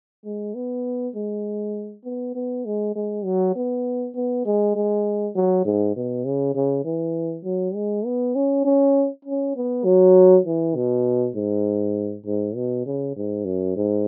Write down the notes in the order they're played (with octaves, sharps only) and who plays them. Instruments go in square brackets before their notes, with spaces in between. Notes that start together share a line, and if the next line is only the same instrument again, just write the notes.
[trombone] G#3
B3
G#3
B3
B3
G#3
G#3
F#3
B3
B3
G#3
G#3
F#3
G#2
B2
C#3
C#3
E3
F#3
G#3
B3
C#4
C#4
C#4
B3
F#3
E3
B2
G#2
G#2
B2
C#3
G#2
F#2
G#2